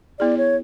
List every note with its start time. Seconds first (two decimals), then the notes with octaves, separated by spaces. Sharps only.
0.19 B3 E4 G#4 D5
0.38 C#5